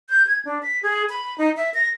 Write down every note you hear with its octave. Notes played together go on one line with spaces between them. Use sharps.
G6
G#6
D4
B6
G#4
B5
D#4
E5
A#6